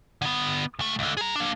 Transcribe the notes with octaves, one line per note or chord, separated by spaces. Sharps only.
D3 B3
C#2 A3
C#2 D3
G#4 A#5
A#3 D4